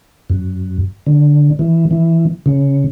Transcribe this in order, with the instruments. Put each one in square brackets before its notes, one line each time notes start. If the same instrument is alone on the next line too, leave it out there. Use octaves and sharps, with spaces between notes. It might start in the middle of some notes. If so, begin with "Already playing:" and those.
[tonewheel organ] F#2
D3
E3
E3
C#3